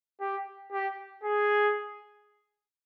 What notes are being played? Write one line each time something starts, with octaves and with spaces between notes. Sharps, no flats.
G4
G4
G#4